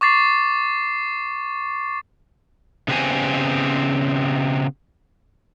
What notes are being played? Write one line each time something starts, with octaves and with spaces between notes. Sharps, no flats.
C#6 D6 A6 C7
C#3 B3 C4 G4 C5 G#5